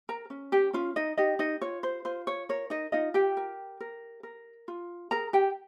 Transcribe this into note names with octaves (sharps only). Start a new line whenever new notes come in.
A#4 A#5
C#4
G4 G5
C#4 F4 F5
D#4 D#5
D#4 G4 D#5
D#4 D#5
F4 C#5
C5
F4 C5
C#5
A#4 C#5
D#4 D#5
D#4 F4 D#5
G4 G5
A#4
A#4
A#4
F4
G#4 A#4 A#5
G4 G5